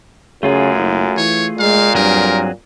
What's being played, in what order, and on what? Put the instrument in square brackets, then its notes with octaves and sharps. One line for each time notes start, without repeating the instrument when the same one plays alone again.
[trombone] F#2 [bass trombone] C#3 [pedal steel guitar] A3 F4 G#4
[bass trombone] F#1
[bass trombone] E3 [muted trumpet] C#5
[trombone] A#2 [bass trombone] G#3 [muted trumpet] F5
[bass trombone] G2 [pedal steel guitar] F#3 C4 G#4 [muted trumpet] A#4